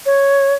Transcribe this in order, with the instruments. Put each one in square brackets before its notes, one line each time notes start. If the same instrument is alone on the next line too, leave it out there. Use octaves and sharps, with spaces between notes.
[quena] C#5